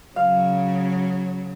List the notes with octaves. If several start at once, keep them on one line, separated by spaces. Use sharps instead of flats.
C#3 F#3 F5